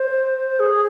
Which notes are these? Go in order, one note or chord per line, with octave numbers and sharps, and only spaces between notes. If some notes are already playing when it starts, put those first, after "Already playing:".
Already playing: C5
G#4